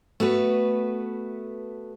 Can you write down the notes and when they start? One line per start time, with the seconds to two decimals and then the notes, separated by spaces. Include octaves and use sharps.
0.20 A3 B3 F#4 B4